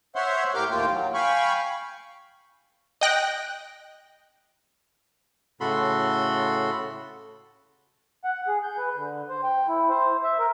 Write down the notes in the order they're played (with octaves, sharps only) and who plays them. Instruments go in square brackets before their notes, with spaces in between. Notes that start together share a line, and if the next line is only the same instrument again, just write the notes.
[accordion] C5 C#5 E5 F#5 C6
A2 G4 A#4 D6 F6 G6
D#2 A2 A#3 F4 G5
F#3
F5 G5 G#5 B5 C#6
[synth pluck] D#5 G5 F#6 A#6
[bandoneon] A2 C#3 F#4 A4 B5 C6
[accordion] F#5
G#4
G6
B4
D3
C5
G5
E4
C5
E5
A#4